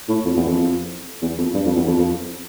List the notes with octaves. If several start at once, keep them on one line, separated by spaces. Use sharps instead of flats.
A2
F2
E2
F2
E2
F2
G2
F2
E2
F2
F2